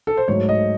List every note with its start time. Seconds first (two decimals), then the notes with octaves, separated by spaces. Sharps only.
0.07 A4
0.17 C5
0.28 G#2 F#3 A3 C#5
0.49 D#5